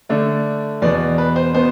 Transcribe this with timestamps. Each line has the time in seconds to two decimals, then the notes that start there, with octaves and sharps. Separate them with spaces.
0.09 D3 A3 D4 D5
0.82 E2 B2 B3 D5
1.18 B4
1.36 C5
1.54 B2 B3 C5